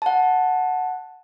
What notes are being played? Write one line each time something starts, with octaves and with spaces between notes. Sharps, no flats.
F#5 A5